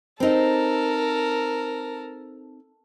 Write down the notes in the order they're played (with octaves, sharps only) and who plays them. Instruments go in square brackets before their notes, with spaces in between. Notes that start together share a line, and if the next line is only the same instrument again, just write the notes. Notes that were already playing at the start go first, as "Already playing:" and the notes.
[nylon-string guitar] C4 D#4 [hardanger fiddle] A4 A#4